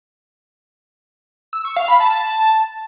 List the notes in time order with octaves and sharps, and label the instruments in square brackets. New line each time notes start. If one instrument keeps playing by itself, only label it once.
[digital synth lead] E6
C#6
F5
B5
A5